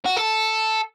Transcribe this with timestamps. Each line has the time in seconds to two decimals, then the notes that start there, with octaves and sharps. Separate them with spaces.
0.06 F#4
0.17 A4